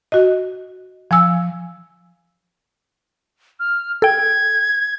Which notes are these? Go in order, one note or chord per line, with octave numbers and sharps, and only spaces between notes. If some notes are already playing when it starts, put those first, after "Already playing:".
F#4 D#5
F3 G#5 E6
F6
A4 G5 G#6